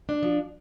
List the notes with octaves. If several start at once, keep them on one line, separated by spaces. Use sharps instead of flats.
D4
F3